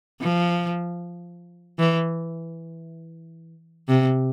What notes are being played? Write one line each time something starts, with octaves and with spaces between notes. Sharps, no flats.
F3
E3
C3